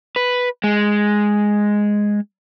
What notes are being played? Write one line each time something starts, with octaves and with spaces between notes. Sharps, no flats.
B4
G#3